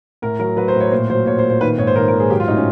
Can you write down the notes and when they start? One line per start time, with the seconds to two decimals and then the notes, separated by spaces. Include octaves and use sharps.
0.22 A2 A#4
0.39 F#3 A#4
0.57 F#3 B4
0.68 C5
0.75 A2
0.80 C#5
0.91 A#2 C5
1.10 F#3 C5
1.26 A#2 C#5
1.38 C5
1.44 A#2
1.50 C5
1.61 D#3 B4
1.78 G#2 C#5
1.87 C5
1.96 D#3 A#4
2.08 A#4
2.13 G#2
2.20 G#4
2.30 F#3 G4
2.40 F4
2.48 A2 D#4
2.57 C#4